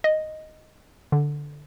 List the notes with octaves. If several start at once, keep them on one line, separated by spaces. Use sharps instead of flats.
D#5
D3